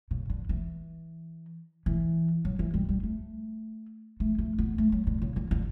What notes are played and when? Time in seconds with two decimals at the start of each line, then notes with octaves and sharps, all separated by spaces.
0.11 C#3
0.30 D3
0.49 E3
1.86 E3
2.45 F#3
2.59 E3
2.74 G3
2.89 G3
3.03 A3
4.20 A3
4.38 A3
4.58 B3
4.78 A3
4.92 F#3
5.07 D3
5.22 C#3
5.36 D3
5.51 D3